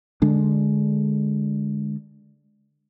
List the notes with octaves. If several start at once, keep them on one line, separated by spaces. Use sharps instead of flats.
D3 G#3 D4